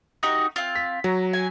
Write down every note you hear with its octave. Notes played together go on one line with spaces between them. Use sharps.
D#4 F#4 G4
C4 F4
B6
F#3 A#5
G#5